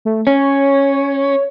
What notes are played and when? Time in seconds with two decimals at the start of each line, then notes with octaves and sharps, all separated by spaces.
0.05 A3
0.27 C#4 C#5